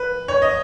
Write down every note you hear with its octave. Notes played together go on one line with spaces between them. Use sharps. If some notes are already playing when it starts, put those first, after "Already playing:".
Already playing: B4
C#5
D#5